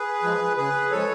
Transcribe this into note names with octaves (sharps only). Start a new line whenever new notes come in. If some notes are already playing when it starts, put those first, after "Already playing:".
Already playing: G#4 B4
F3 G#3
C#3 G#4 B4
F3 G#3 A4 C#5